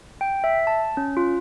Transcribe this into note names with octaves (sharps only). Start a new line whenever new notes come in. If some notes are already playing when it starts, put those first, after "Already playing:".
G5
E5
A5
C#4
F4